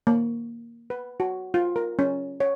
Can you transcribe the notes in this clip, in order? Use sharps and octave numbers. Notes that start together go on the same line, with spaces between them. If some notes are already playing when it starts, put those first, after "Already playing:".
A#3
B4
F#4
F4
A#4
C#4
C#5